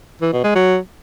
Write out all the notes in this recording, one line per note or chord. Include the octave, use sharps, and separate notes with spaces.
E3
B2
G#3
F#3